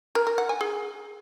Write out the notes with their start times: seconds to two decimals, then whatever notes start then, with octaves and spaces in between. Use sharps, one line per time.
0.15 A#4
0.27 A#4
0.38 F#5
0.49 G#5
0.61 G#4